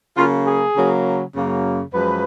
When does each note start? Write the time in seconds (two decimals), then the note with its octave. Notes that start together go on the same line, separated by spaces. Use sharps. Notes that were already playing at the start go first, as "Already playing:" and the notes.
0.17 C#3 F#3 A#3 F4
0.47 G#4
0.76 C#3 F#3 A#3
1.35 F#2 C#3 F#3 A#3
1.94 F#2 F3 G#3 B4